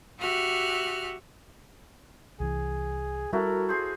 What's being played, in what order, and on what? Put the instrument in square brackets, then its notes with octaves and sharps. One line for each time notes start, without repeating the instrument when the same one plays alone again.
[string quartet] F#4 G4 E5 F6 F#6
[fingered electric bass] C2 E3 [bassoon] G#4
[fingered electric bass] G3 [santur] E4 F#4 A4 [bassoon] A#4
[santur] G#4 C5